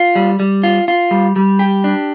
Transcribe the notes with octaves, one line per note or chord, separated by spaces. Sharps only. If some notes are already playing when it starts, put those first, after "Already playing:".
Already playing: F4
G3
G3
F4
F4
G3
G3
G4
D4